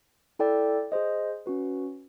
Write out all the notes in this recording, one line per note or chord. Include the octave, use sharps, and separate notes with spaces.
E4 A4 D5 G5
G#4 C5 D#5
C#4 F#4 B4